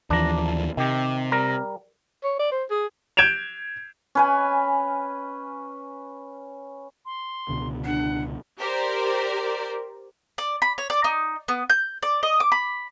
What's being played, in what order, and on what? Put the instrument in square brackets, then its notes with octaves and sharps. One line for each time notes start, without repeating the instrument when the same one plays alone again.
[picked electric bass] D#2 E3 F3 [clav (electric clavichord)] D4 A#5
[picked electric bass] C3 [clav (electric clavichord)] D#3 G4
[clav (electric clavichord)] G3 A#4 A#5
[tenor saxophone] C#5
D5
C5
G#4
[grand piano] G6 G#6 D7 E7 F7
[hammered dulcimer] C#4 B4 G#5
[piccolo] C6
[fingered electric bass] C#2 B2 D3
[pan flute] D4 [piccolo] F#5
[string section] G4 A#4 C5 D5
[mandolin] D5
B5
C#5
D5
D#4
B3
G6
D5
D#5
D6
B5